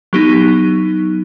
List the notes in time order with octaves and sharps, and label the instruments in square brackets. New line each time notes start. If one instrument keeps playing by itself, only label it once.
[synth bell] F#3 B3 D#4 G4